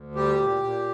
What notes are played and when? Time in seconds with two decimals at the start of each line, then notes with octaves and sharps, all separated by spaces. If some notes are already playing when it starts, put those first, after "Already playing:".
Already playing: D2
0.15 G3 G4
0.39 A#2
0.63 A#2